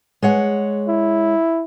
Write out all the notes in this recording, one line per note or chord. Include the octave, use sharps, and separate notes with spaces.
G#3 C#5 F#5
E4